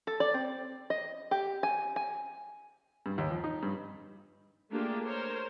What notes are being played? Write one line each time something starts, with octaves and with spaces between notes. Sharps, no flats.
A4
D5
C4
D#5
G4
G#5
G#5
G2
D#2
F3
D#4
G2
A3 A#3 D4 F4 G4 G#4
A#4 C5 C#5